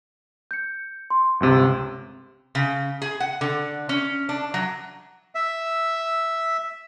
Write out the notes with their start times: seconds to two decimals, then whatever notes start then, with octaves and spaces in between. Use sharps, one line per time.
0.51 G6 C#7
1.10 C6
1.40 G1 C#2 C3
2.55 C#3
3.02 G#4
3.20 F#5
3.41 D3
3.89 C#4
4.29 D4
4.54 F#3
5.35 E5